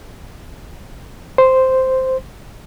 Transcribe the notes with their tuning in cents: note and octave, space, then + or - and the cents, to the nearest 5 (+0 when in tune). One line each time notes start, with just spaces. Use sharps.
C5 -5